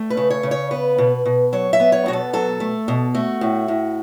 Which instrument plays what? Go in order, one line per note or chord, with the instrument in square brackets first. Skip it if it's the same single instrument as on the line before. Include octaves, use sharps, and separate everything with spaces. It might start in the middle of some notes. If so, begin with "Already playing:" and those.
Already playing: [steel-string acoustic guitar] A3
B4
C#3
C#5
C#3
C#5
B3 B4
B2
B2
F#3 C#5
E5
B3
C#5
B2 F#4
A4
F#3 A4
A3
B2
A3 F#4
A2
A2